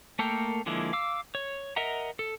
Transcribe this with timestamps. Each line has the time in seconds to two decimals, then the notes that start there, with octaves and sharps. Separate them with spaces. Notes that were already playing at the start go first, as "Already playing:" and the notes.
0.19 A3 A#3 A4 A#4 G5
0.66 D3 F3 G#3 A#3 E4
0.93 F5 D6 E6
1.35 C#5
1.76 A#4 D#5 E5 F#5 A#5
2.19 A4